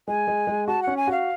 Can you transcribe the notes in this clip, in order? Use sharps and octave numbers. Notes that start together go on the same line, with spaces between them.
G#3 G#5
G#3
G#3
F#4 A5
C#4 F#5
G#5
F#4 F5